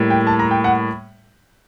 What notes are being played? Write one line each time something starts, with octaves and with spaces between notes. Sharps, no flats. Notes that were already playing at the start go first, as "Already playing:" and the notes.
Already playing: A2 G3 A#3
G5
A5
A#5
G5
F#5